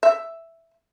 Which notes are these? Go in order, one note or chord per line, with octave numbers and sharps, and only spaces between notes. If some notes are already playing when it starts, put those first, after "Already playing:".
E5